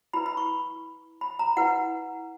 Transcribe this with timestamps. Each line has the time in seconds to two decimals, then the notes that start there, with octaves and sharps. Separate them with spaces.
0.13 E4 B4 B5
0.26 B5
0.37 C#6
1.21 B5
1.39 A#5
1.57 E4 B4 F#5